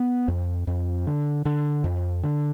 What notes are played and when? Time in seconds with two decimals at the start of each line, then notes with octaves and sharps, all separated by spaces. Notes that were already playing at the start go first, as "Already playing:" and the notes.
Already playing: B3
0.28 F2
0.67 F2
1.07 D3
1.45 D3
1.84 F2
2.23 D3